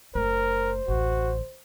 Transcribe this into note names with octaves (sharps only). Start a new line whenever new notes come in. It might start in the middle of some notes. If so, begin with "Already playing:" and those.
F#1 A3 A#4 C5
A1 D2 F#4